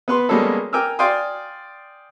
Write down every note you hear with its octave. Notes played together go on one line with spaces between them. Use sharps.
B3 B4 C6
G3 G#3 A#3 B3 C#4 A4
A#4 G5 G#5 D6 E6 F6
D5 F5 G5 G#5 C6 D#6